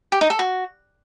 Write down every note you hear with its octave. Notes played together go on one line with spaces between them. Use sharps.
G4
D#4
A4
F#4